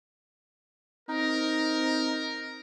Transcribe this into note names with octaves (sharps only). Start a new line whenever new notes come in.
C4 D#4 A#4